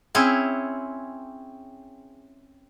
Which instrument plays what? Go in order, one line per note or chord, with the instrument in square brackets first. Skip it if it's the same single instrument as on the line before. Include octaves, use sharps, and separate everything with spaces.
[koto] C4 C#4 E4 G#4 C#5